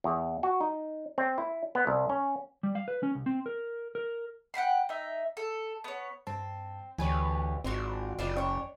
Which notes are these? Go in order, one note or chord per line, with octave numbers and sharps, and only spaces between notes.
E2
F#4
D#4
C4
E4
B3
C2
C#4
G3
F5
B4
C#4
C2
C4
A#4
A#4
F#5 G5 B5 C6
D#4 E5
A4
B3 C#5
G2 C4 A5
D2 E3 G4 B4 C#5 G#5
G#1 C4 D4 F4 F#4
F#1 G3 D4 F4
C#4 D4 C#5 G5